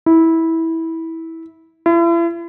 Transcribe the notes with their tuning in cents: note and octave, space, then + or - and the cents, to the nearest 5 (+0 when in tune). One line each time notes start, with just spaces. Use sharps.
E4 -15
E4 +40